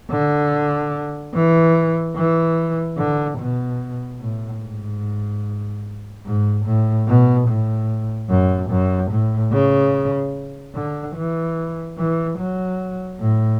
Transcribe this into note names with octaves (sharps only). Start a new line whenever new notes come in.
D3
E3
E3
D3
B2
A2
G#2
G#2
A2
B2
A2
F#2
F#2
A2
C#3
D3
E3
E3
F#3
A2